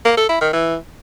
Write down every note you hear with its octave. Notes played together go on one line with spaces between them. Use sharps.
A#3
A4
E4
D#3
E3